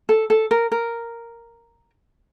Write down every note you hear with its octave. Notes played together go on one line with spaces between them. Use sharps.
A4
A4
A#4
A#4